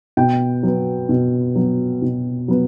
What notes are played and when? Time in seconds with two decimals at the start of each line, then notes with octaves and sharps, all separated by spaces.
0.17 B2 G5
0.63 F#3 B3
1.09 B2
1.55 F#3 B3
2.02 B2
2.48 F#3 B3